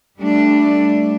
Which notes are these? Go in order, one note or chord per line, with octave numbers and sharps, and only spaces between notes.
G3 A3 D4